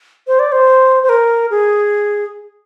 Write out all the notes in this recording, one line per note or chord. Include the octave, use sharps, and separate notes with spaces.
C5
D5
C5
C5
A#4
G#4